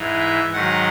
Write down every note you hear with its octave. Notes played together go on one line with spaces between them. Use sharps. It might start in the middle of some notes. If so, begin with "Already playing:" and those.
Already playing: G#2 E3
E5
G#2 D#3 F#3 F#5